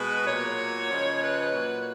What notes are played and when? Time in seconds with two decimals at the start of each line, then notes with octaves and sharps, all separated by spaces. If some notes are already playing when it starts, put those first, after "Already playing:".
Already playing: B2 G#3 B4
0.27 A#2 F#3 C#5
0.90 C#3 F3 G#3
1.21 B4
1.53 A#2 F#3